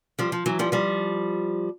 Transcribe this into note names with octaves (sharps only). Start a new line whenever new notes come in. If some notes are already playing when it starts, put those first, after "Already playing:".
F3 G3
F3
E3 F#3
F3 G3
F3 G3